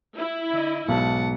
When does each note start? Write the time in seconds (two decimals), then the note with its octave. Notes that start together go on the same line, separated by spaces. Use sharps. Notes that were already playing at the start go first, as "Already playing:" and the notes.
0.18 E4
0.50 D3 D#5
0.88 B1 G#2 F#5 A5